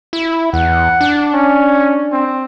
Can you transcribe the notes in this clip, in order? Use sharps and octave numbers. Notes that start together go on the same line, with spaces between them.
E4
E2 F#5
D4
C#4
C4